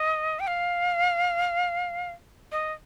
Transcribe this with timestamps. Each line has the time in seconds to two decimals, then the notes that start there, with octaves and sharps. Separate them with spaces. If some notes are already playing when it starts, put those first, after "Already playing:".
Already playing: D#5
0.40 G5
0.47 F5
2.52 D#5